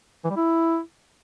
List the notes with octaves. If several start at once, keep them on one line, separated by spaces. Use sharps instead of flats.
E3
G3
E4